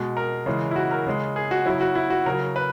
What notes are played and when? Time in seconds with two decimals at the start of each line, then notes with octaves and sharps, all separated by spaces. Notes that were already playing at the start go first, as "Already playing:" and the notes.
Already playing: B2 G#3
0.17 A#4
0.46 C#3 E3 G#3
0.71 E4
0.76 F#4
0.91 A#4
1.07 C#3 G#3
1.36 G#4
1.51 F#4
1.66 C#3 F#3 E4
1.81 F#4
1.95 E4
2.10 F#4
2.26 C#3 F#3 A#4
2.56 B4